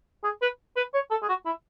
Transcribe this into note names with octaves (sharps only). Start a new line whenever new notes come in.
G#4
B4
B4
C#5
A4
G#4
F#4
E4